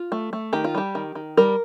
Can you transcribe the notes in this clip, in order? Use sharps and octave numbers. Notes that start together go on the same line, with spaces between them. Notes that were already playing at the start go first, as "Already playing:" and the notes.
Already playing: F4
A3
A3
D#3 G4
F4
G3 G4
D#3
D#3
G3 A#4